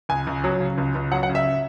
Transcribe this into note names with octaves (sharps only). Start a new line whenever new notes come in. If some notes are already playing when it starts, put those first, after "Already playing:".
C#2 G#5
C#2
F#3
C#3
C#2
C#2
F#3 F#5
F#5
C#3
E5